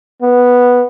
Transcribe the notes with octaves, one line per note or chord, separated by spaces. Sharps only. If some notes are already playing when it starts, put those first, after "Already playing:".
B3